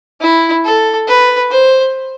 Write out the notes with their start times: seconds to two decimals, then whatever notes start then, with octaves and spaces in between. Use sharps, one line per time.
0.21 E4
0.65 A4
1.08 B4
1.51 C5